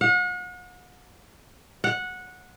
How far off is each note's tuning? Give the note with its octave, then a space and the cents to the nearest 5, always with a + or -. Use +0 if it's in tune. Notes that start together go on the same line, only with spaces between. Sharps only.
F#5 -40
F#5 -15